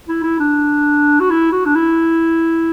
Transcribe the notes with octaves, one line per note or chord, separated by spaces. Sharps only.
E4
E4
D4
F#4
E4
F#4
D4
E4